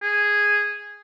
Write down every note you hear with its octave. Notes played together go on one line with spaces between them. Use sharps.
G#4